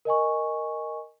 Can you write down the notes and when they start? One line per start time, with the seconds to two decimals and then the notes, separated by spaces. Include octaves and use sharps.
0.05 A#4 D#5 G#5 C#6